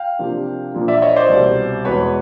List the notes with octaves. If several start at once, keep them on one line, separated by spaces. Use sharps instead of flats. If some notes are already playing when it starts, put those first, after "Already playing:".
Already playing: F5 G5
C3 F3 A#3 D4
A#2 F3 A#3 D4
D5 E5
C#5 D#5
C5 D5
C2 B2 G3
E2 B2 G#3 B4 C#5